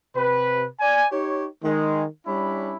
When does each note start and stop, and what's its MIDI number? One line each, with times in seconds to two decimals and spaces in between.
0.15 0.66 48
0.15 0.66 71
0.80 1.06 74
0.80 1.06 80
1.12 1.46 63
1.12 1.46 67
1.12 1.46 73
1.63 2.04 51
1.63 2.04 56
2.26 2.77 55
2.26 2.77 61
2.26 2.77 62
2.26 2.77 64
2.26 2.77 83